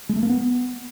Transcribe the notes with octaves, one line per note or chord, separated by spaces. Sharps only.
G#3
A3
A#3
B3